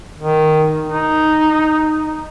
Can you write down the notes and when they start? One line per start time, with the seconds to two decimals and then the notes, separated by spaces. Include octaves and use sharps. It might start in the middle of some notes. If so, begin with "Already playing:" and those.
0.18 D#3
0.89 D#4